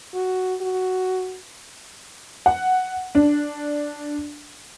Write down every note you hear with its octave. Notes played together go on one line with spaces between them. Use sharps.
F#4
F#4
F#5
D4